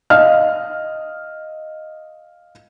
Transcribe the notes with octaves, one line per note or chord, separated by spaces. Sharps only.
D#5 F5 F6